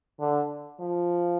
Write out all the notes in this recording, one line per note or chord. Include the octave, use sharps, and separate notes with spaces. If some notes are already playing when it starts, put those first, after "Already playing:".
D3
F3